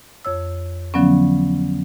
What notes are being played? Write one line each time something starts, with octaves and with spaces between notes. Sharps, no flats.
F2 C#5 E6
D3 F3 F#3 B3 C#4